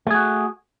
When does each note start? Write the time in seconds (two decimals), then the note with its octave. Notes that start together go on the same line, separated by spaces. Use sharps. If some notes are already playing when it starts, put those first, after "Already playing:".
0.07 A3
0.11 G#4
0.14 F#4